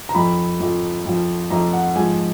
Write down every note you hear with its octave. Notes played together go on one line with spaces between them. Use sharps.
A#5
F2 F3 B5
F2 F3
F2 F3
F2 F3 A#5
F#5
G#2 F3 G#5